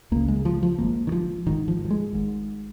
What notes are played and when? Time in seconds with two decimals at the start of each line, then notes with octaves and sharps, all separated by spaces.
0.12 C#2 C#3 A#3
0.28 G#3
0.45 F3
0.63 F3
0.78 G#1 G#2 A#3
1.07 D#3
1.12 F3
1.46 G#1 G#2 D#3
1.68 F3
1.85 F3
1.90 G#3
2.13 G#1 G#2